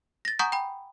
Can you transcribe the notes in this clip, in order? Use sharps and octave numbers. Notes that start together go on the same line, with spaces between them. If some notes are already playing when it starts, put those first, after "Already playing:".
A6 A#6
F#5 G#5 A#5 C#6 D#6 G6
G5 B5